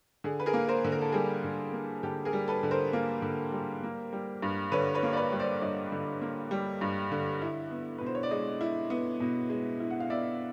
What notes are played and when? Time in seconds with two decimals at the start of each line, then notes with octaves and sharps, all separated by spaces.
0.24 D3 G#4
0.40 B4
0.46 G#4 A#4
0.53 A#3
0.68 A#4 C5
0.85 D3
0.92 A#4
1.01 A4
1.12 G3 G#4 A#4
1.44 D3
1.73 A#3
2.03 D3 G4 A4
2.25 G#4 A#4
2.33 G3
2.48 A4 B4
2.63 D3
2.71 A#4 C5
2.93 A#3
3.22 D3
3.52 G3
3.83 A#3
4.13 G3
4.43 G2
4.72 D3 B4 C#5
4.95 B4 C#5
5.03 A#3
5.13 D5
5.17 B4 C#5
5.32 G3
5.39 C5 D5
5.61 G2 C#5 D#5
5.92 D3
6.21 A#3
6.51 G3
6.81 G2
7.12 D3
7.42 E4
7.71 B3
7.98 B2 B4
8.06 C5
8.15 C#5
8.23 D5
8.31 G#3 C#5 D#5
8.61 E4
8.90 B3
9.20 B2
9.50 G#3
9.80 E4
9.90 F#5
10.00 F5
10.10 B3 D5 E5